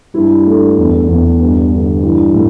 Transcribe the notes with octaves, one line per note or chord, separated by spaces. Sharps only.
G2 E4
A3
E2
E2
G2 B3
D3
E3
A2